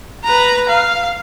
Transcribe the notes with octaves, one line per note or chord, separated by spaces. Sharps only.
B4 A#5
F5